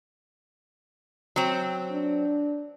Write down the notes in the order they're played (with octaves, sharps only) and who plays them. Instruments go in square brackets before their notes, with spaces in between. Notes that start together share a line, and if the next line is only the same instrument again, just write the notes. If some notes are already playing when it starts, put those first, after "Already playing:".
[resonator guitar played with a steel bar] F#3 C4
[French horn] D4